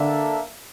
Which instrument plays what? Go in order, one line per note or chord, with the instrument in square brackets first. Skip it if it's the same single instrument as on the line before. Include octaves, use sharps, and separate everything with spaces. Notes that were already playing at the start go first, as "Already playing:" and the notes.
Already playing: [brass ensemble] D3 [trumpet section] A#3 D4 A4 E5